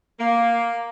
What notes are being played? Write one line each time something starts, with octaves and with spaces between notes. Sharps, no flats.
A#3